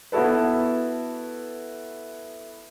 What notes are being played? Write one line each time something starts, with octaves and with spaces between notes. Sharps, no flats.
B3 E4 F#4 A4 B4